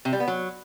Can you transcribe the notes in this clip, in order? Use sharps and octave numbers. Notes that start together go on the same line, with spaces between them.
C3
G3
B3
F#3